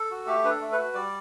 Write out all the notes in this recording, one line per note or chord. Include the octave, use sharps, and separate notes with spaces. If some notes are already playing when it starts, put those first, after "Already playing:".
Already playing: A4
F#4
A3 G4
D4 B4
A4
A3
B4
F#4
G3 D5